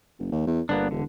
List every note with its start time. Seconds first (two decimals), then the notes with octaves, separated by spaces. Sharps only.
0.19 F#1
0.32 D#2
0.47 E2
0.69 G1 A#3 B3 D4
0.91 E1 D3